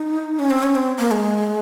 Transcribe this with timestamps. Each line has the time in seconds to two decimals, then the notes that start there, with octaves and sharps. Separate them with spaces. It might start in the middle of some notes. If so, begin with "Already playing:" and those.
Already playing: D#4
0.39 C#4
0.50 C4
0.63 C#4
0.75 C4
0.99 A#3
1.11 G#3